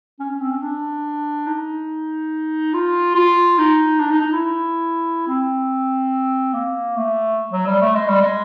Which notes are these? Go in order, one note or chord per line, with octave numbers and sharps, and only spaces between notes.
C#4
C#4
C4
C#4
D4
D#4
F4
F4
D#4
D4
D#4
D#4
E4
C4
A#3
A3
F#3
G3
A3
G#3
G3
G#3